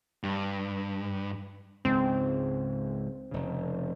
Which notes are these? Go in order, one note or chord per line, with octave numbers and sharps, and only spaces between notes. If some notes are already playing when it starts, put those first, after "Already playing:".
G2
C#2 G#2 C4
F1 C#3